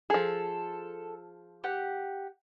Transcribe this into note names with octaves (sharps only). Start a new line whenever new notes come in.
F3 G#4 A4
G4 F#5